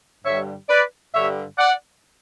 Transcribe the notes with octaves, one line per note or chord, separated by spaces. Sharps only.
G2 D3 G3 C#5 E5
B4 D5
G2 D3 G3 C#5 E5
D5 F#5